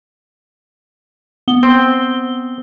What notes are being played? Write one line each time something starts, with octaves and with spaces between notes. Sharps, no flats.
B3 G7
C4